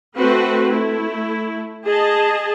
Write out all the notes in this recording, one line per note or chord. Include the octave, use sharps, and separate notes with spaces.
A3 C4 F#4 B4
A3 E4
G#4 D#5 A5